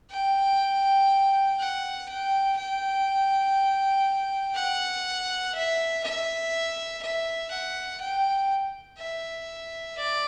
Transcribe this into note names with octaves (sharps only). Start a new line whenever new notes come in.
G5
F#5
G5
G5
F#5
E5
E5
E5
F#5
G5
E5
D5